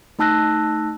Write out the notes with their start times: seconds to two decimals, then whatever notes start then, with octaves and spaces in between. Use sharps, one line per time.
0.19 A3 D#4 A5 E6 F#6 A#6